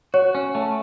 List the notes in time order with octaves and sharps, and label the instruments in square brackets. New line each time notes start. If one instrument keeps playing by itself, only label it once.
[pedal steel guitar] F#4 [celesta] C#5
[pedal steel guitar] C#4
A3